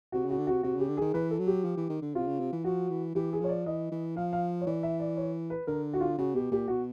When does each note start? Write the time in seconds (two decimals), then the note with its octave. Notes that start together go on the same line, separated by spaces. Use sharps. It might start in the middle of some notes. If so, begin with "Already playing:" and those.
0.12 C3 F#4
0.25 C#3
0.30 F#4
0.38 D3
0.47 C3 F#4
0.63 C3 F#4
0.76 C#3 G4
0.88 D3
0.97 D#3 G#4
1.14 E3 B4
1.31 A4
1.39 F#3
1.47 G4
1.64 F3
1.77 E3
1.90 D#3
2.02 D3
2.15 C3 F4
2.27 C#3
2.40 C3
2.52 E3
2.64 F3 F#4
2.90 E3
3.15 E3 G4
3.33 G#4
3.40 F3 C#5
3.49 D5
3.66 E3 D#5
3.91 E3
4.16 F3 F5
4.33 F5
4.61 C#5
4.66 E3 D5
4.83 E5
5.00 D5
5.17 C#5
5.50 B4
5.67 D3 A#4
5.94 F#4
6.01 F4
6.18 C#3 F#4
6.35 B2 G4
6.51 A#2 G4
6.68 B2 F#4